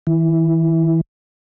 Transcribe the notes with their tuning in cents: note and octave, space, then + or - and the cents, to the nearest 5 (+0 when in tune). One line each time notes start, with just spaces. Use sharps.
E3 -40 E4 +0